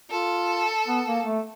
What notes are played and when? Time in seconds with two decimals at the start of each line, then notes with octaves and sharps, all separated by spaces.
0.11 F4 A4
0.88 B3
1.07 A#3
1.26 A3